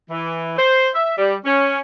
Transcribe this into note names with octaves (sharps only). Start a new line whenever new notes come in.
E3
C5
E5
G3
C#4